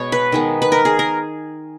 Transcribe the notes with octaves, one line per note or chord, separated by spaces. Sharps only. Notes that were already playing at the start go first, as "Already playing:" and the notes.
Already playing: B2 G#3 B3 C#5
B4
D#3 G#3 B3
B4
A#4
G#4
A#4